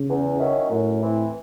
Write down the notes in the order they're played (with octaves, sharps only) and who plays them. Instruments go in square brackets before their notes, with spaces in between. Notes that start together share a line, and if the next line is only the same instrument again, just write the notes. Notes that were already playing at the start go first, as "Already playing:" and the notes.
Already playing: [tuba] C#3
[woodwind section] E2
D#3 F#3 C#4 E4
[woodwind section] F#2 [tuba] A2
[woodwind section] E3 C4